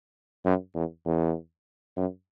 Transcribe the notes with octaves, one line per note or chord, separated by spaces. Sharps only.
F#2
E2
E2
F#2